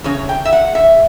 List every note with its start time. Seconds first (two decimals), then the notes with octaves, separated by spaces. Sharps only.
0.04 E2 C#3 C#5
0.29 G5
0.45 E5
0.53 F#5
0.75 E5